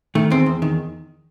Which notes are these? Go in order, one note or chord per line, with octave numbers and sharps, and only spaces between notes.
D#3 A3
E2 C4
E2
D#3